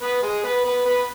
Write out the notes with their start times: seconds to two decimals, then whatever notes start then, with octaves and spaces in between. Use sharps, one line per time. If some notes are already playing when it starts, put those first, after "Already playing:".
0.02 B3 B4
0.23 G#3 G#4
0.44 B3 B4
0.64 B3 B4
0.86 B3 B4